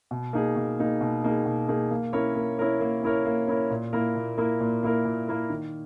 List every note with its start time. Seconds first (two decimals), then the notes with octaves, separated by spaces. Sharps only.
0.11 B2
0.33 A#3 D#4 G#4
0.56 B2
0.79 A#3 D#4 G#4
1.01 B2
1.24 A#3 D#4 G#4
1.46 B2
1.68 A#3 D#4 G#4
1.91 A#3
2.13 C#4 E4 A#4 C#5
2.36 A#3
2.58 C#4 E4 A#4 C#5
2.81 A#3
3.03 C#4 E4 A#4 C#5
3.25 A#3
3.48 C#4 E4 A#4 C#5
3.70 A#2
3.93 A#3 E4 A#4
4.15 A#2
4.38 A#3 E4 A#4
4.61 A#2
4.83 A#3 E4 A#4
5.05 A#2
5.28 A#3 E4 A#4
5.50 D#3